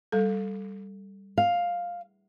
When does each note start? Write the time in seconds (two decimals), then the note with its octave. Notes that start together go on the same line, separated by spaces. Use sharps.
0.12 G3 A4
1.38 F5